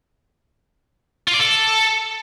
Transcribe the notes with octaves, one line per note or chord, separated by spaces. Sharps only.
F4
D5
A4